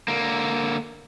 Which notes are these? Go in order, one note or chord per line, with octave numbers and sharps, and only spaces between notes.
D3 A#3